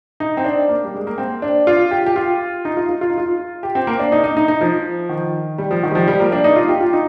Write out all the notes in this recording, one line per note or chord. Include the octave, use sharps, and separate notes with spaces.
D#4
C4
D4
A#3
G3
G#3
A#3
C4
D4
F4
G4
G4
F4
D#4
F4
F4
F4
D#4
F4
G4
C4
A#3
D4
D#4
D#4
D#4
D#4
F3
D#3
G3
F3
D#3
G3
F3
G3
A#3
D4
D#4
F4
G4
F4
D#4